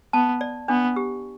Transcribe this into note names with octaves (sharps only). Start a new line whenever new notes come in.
B3 A5
D5
B3 D4
G4